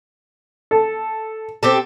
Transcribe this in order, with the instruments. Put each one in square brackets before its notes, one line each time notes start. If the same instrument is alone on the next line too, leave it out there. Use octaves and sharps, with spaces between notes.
[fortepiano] A4
[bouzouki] C4 G4 A4